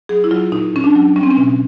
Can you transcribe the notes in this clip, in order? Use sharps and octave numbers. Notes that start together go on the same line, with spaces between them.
F#3 G#4
E4
F#3 F4
A#2 D#4
A#2 C#4
D4
F#3
G3 C#4
C4
C#4
B2